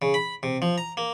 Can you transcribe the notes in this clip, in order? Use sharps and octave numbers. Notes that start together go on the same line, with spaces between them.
C#3
B5
C3
F3
A#5
A#3